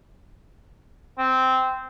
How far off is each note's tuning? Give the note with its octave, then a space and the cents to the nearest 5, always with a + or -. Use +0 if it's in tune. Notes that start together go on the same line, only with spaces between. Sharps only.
C4 -10